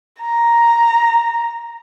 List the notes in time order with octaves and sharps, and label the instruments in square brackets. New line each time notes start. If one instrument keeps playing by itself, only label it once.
[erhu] A#5